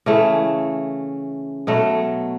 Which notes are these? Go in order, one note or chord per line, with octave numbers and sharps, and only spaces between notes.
C#3 E3 A3
B2 F#3 A3